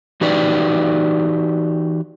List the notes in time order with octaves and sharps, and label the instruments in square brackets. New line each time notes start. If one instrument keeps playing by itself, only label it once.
[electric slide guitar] E3 D#4 F#4 G4 B4 D5